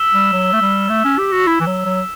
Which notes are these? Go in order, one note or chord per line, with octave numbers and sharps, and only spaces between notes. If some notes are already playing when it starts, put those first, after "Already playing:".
Already playing: E6 B6 E7 G7
G3
F#3
A3
G3
A3
C#4
G4
F#4
E4
E3
F#3
F#3